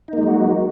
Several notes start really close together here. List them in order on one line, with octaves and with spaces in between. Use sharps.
D#4 A#3 G#3 F#3 F#4